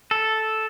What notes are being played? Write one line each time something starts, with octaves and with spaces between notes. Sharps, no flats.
A4